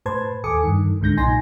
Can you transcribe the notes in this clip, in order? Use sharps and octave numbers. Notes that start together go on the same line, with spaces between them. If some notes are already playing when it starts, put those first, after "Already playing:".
A2 B4 C5 A5 C6 G#6
D#2 A4 G#5 D6 D#6 C#7
G2 D#3
C#2 G#2 D3 G6 A#6
B1 A#2 D#4 G#5 C6 A#6